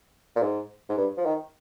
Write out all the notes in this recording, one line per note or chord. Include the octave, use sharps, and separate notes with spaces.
A#2
G#2
G#2
G2
F3
D#3